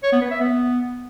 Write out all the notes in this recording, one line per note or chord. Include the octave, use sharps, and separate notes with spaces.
C#5
B3
B4
E5
B3